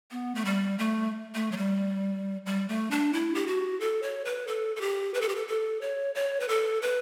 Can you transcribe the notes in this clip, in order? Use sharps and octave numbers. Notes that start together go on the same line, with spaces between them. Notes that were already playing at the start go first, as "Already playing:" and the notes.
B3
A3
G3
A3
A3
F#3
G3
G3
A3
D4
E4
G4
F#4
A4
C#5
B4
A4
A4
G4
B4
A4
G4
A4
A4
C#5
C#5
B4
A4
B4